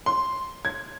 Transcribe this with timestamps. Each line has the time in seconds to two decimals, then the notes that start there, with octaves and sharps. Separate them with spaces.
0.06 C6
0.65 G#6